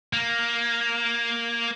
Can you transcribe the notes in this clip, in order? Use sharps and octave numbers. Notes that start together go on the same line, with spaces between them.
A#3